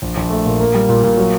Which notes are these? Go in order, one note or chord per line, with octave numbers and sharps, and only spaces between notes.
A#1
A#1
A3
A#2
A#3
G3
A#2
A#2
F#3